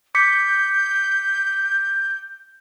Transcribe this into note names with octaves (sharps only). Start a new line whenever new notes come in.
D6 G6 B6 C#7